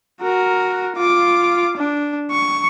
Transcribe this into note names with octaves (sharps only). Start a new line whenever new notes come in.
F#4 A#4
F4 D6
D4
C#6